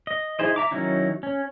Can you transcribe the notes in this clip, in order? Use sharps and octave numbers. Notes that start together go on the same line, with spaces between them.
D#5
D#4 E4 G#4 C5 D#5
E5 A#5 D6
D#3 F#3 C#4 D#4 E4
C#4